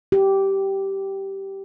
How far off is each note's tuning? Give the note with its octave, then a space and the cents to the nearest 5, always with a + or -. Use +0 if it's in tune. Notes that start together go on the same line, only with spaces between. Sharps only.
G4 -10